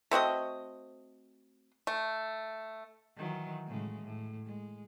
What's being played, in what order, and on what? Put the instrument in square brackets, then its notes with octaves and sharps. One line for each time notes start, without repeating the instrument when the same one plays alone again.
[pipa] A3 C4 F#4 D#5
A3
[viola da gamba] D#3 E3 F#3
A2 C#3 G#3
A2
G#3